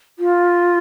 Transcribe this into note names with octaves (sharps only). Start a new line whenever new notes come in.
F4